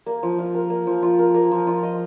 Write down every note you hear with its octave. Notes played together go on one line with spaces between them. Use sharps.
A#3
F3
F4
A#4
A#3
F3
F4
A#4
A#3
F3
F4
D#5